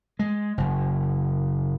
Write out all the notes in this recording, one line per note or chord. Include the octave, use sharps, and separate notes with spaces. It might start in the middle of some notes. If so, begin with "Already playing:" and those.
G#3
F#1